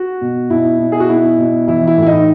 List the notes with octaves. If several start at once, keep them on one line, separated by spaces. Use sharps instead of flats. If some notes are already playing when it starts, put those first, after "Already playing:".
Already playing: F#4
B2
B2 E4
B2
G#4
F#4
B2 E4
B2
E3 E4
E4
A2
E4
D#4